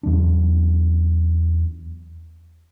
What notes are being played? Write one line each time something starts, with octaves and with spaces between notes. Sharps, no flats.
E2 F#3 C#4 D4